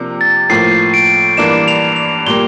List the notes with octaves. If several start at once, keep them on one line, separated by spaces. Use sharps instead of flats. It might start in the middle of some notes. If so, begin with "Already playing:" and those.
Already playing: C3 F3 A#3 D4
A6
A2 F3 A#3 C7
D7
G2 E3 A#3 D4 E7
F7
F7
A#2 G3 A#3 G7